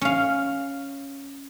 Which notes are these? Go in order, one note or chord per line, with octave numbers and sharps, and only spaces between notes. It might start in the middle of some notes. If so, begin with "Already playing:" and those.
C#4 F5